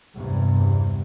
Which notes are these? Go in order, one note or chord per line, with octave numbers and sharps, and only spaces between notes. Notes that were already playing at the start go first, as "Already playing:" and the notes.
E2 G2 C3